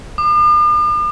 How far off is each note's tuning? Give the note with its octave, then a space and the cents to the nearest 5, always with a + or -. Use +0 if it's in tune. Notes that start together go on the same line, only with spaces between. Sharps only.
D6 +45